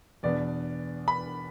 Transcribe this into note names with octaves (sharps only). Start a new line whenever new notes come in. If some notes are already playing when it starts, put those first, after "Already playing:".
E2 B2 B3 D4 D5
B5